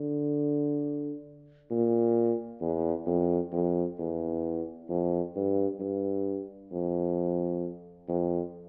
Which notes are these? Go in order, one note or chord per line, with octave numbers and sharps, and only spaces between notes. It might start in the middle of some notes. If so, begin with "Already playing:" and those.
Already playing: D3
A#2
E2
F2
F2
E2
F2
G2
G2
F2
F2